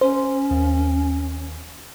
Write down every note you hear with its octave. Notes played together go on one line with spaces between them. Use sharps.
C#4 C5
D#2